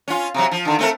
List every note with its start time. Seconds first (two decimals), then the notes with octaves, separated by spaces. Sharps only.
0.08 C#4 F4
0.34 C3 F#3
0.51 F3
0.65 D3 D#3
0.79 A3 C4 A#4